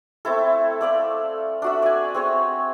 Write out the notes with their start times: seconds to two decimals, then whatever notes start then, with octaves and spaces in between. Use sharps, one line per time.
0.25 A3 C4 E4 A4
0.81 A4 D5 F5
1.62 D4 F#4 E5
1.82 D5 G#5
2.15 C4 G#4 C#5